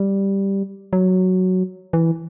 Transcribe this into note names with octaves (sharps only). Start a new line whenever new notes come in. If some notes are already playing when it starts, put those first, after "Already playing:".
Already playing: G3
F#3
E3